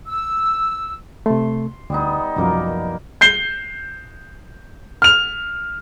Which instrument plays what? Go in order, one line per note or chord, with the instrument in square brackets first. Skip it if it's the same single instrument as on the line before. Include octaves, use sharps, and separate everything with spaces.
[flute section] E6
[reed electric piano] C3 A3 [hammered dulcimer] C6
[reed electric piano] D2 [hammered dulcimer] G3 B3 D#4
[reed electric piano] C2 F#2 F3 [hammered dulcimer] B2 A#3 A#4
[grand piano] G6 C7 G7
F6 F7